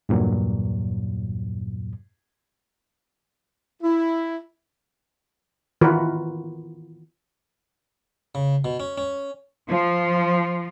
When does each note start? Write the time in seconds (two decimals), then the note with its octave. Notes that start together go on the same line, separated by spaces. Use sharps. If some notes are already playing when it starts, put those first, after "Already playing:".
0.09 E2 G2 A#2 F#3
3.82 E4
5.81 D#3 E3 F4 F#4 A#4 B4
8.35 C#3
8.65 B2
8.80 C#4
8.98 C#4
9.69 F3